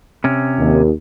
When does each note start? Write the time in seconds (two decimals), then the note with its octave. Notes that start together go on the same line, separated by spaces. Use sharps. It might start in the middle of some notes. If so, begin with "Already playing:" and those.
0.24 C3 C#4
0.59 D#2